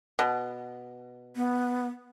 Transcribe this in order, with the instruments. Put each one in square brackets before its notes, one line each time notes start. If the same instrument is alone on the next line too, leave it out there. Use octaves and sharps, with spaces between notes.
[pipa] B2
[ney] B3